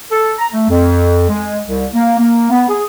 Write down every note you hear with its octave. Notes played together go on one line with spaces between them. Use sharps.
A4
A#5
A3
F2
G#3
C2
A#3
A#3
B3
G#4